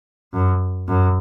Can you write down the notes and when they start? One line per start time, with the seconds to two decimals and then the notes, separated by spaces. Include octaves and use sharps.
0.33 F#2
0.88 F#2